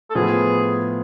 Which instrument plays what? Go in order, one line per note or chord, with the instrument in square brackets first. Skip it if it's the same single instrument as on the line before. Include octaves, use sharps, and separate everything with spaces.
[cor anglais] A4
[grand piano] A2 F3 B3 F4 [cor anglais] G#4